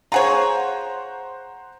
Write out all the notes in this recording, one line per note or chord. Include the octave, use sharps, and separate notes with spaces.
F4 G#4 C5 C#5 F#5 A#5